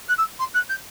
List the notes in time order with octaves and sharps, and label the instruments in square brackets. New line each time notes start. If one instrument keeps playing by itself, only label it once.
[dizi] F#6
E6
C6
F#6
G6